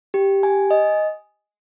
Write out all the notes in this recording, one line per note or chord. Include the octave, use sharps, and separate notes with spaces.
G4
G#5
D#5